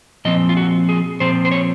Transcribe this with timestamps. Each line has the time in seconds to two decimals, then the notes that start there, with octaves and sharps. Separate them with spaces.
0.25 A#2 F3 C4 D#5
0.49 F4
0.57 F#4
0.89 G#4
1.20 A#2 F3 C4 C5
1.45 C5
1.51 C#5